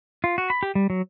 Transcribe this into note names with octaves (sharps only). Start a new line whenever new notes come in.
F4
F#4
B5
G4
G3
F#3